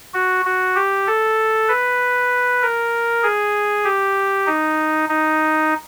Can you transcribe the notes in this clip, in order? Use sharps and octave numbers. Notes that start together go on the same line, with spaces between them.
F#4
F#4
G4
A4
B4
A#4
G#4
G4
D#4
D#4